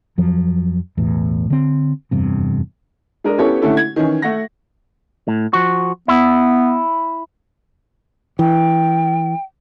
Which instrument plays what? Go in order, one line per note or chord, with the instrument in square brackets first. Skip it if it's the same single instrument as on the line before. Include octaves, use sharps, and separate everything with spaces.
[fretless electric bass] F2 F3 F#3
B1 E2 A2
D3 C4
F1 E2 G2 C3
[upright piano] G#3 D4 A#4 D#5
B3 C#4 E4 G4 A4 C#5
D3 A3 C#4 E4 A4
G#6
D#3 E3 C#4
A3 F#5 A#6
[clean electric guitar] A2
F3 F#4
[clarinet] B3 [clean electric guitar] E4
[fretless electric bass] E3 [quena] G5